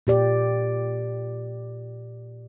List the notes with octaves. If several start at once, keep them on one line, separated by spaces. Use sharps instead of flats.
A#2 G4 D5